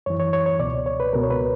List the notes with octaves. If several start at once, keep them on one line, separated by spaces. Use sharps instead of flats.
F#2 E3 C#5
C#5
C#5
C#5
C#2 B2 D5
C#5
B4
C#2 B2 A#4
C#5
B4